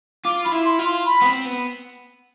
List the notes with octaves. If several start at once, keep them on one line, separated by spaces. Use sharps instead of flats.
F4 D6
F4 B5
E4
C6
F4
C6
B5
B3
C4
B3